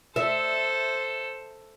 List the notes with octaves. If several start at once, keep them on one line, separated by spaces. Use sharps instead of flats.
A4 C5 E5